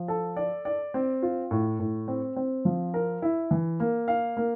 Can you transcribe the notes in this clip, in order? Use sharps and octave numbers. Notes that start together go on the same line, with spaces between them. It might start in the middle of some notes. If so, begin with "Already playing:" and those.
Already playing: F3
A4
D5
D5
C4
F4
A2
A2
C4
C4
F3
A#4
E4
E3
A#3
F5
A#3